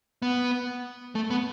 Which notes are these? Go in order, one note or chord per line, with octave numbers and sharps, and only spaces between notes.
B3
A3
B3